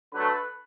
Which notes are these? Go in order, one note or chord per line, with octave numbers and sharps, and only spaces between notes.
D3 F#3 A3 B4